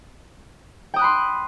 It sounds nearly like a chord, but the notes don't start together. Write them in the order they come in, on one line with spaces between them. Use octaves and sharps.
G5 D#6 F#6 B5 C6